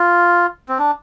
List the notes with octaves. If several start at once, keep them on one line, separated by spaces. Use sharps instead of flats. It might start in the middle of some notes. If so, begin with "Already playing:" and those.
Already playing: F4
C4
D4